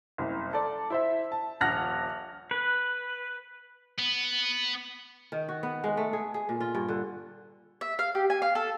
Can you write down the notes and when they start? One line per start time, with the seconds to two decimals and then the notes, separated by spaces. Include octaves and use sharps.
0.18 F#1 C2
0.53 A4 D5
0.90 E4 C5 E5
1.32 A5
1.61 D#1 A#1 F#5 F6 F#6 A#6
2.51 B4
3.98 B3
5.32 D#3
5.49 F#4
5.63 B3
5.84 G#3
5.97 A3
6.13 G#4
6.34 G#4
6.49 A#2
6.60 F4
6.74 G2
6.88 D3
7.81 E5
7.99 F5
8.15 G4
8.30 G#5
8.42 F5
8.55 A4